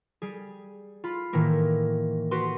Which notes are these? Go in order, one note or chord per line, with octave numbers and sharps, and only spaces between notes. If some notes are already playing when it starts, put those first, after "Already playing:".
G3 G#4
F4 B5
A2 D#3 E3 A#3
F#4 G4 B4 C6